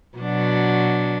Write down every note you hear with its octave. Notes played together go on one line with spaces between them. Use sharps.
B2 F#3 D4